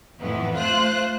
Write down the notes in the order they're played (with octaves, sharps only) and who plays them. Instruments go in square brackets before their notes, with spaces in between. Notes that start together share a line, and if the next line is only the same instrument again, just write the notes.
[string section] F2 A2 E3 B3
A3 F4 C5 F#6